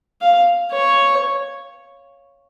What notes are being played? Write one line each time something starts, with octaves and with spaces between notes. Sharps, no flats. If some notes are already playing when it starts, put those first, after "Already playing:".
F5
C#5